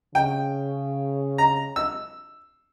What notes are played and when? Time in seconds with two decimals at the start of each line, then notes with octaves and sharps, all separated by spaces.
0.15 C#3 G5
1.38 A#5
1.76 E6